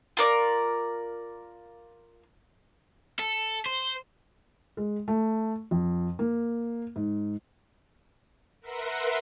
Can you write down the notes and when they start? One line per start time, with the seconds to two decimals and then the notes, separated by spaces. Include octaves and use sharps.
0.17 F4 A#4 D5
3.19 A4
3.66 C5
4.77 G#3
5.08 A3
5.71 F2
6.19 A#3
6.96 G#2
8.61 A#4 B4 E5 F#5 A#5 C6